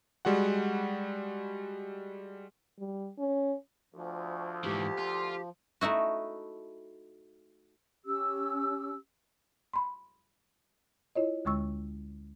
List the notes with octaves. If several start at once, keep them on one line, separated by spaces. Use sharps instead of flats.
G3 G#3 F#4 F#5
G3
C#4
D2 F3
G#2 E3 G4
F4
A3 D#4 E4 F#4
C#4 G4 E6
B5 C6
E4 F4 C#5 D#5
D2 D3 G#3 C#6 E6